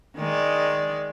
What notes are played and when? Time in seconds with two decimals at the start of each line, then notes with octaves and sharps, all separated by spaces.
0.17 D#3 G#3 D5